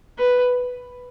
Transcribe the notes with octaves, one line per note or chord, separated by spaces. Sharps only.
B4